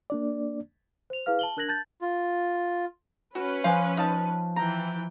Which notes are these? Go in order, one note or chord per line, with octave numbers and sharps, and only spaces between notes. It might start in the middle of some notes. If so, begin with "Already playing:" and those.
A#3 D4 D5
C5 F7
E4 G#4 B4 F5 F6
A5 F#7 G7
D4 A#4 F#6 G#6 A#6 F#7
A5 G6 A6
F4
C#4 F#4 B4
F3 F5 G#5
D#4 F5 A5
E3 G5 A#5